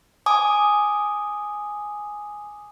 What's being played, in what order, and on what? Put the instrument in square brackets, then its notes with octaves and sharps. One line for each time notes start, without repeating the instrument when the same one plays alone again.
[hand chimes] G#5 D6 D#6